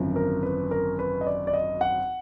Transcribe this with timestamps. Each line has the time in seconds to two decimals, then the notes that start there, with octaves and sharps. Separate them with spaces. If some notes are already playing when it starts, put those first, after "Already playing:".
Already playing: G#1 F#2 D3 F3
0.16 A#4
0.43 B4
0.71 A#4
0.99 B4
1.21 D#5
1.27 D5
1.47 D5
1.53 D#5
1.81 F#5